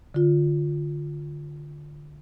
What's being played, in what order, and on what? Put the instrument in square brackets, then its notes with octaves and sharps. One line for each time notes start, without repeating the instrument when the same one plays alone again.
[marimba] D3 F4